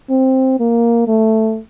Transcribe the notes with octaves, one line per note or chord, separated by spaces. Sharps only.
C4
A#3
A3